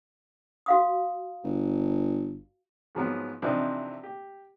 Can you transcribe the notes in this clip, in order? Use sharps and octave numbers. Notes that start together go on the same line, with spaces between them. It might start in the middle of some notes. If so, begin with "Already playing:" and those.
F#4 F5 D#6
G1
G#2 F3 F#3 B3
C3 E3 F3 C4 D4 D#4
G4